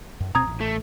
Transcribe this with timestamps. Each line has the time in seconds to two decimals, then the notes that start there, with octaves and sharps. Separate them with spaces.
0.20 F#2
0.35 D#1 B2 C4 A#5 D#6 G#6
0.47 A1
0.60 A3